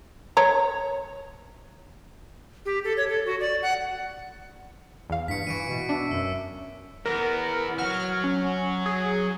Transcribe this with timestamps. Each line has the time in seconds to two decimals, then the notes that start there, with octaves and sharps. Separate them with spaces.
0.37 C#5 A#5
2.65 G4
2.84 A4
2.97 C#5
3.09 A4
3.26 F#4
3.40 D5
3.62 F#5
5.10 E2 F5
5.28 G2 B6 C#7
5.47 E3 C#6 D7 D#7
5.69 B2
5.89 D4 E5
6.11 F#2 E6
7.06 E3 B3 A#4
7.78 F#3 F#4 F6
8.24 C#4
8.86 G#4